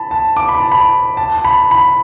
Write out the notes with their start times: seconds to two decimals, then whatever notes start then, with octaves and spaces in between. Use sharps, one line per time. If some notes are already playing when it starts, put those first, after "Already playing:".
Already playing: A5 B5
0.11 A5
0.37 D6
0.49 B5
0.60 A5
0.72 B5
1.17 A5
1.37 A5
1.45 B5
1.71 B5